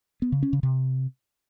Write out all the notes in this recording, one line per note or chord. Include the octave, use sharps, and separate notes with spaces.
B3
C#3
C#4
C#3
C3